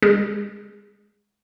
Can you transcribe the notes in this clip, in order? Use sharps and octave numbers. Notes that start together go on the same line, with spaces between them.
G#3